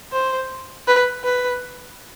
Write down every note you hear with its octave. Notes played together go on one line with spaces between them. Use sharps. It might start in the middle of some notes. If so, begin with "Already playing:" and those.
C5
B4
B4